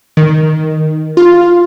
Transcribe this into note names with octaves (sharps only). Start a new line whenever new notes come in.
D#3
F4